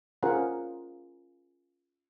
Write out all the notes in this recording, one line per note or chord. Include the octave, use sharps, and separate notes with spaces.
C#4 F4 G#4 A#4 C5 F#5